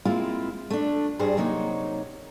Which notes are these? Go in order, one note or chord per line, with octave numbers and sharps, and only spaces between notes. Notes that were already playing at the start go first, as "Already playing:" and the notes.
G#3 A#3 C4 E4 F4
A3 D4
G2 G3 G#4 C5
C3 F#3 A#3 D#4 C#5